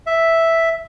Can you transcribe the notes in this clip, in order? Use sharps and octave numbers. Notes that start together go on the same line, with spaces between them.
E5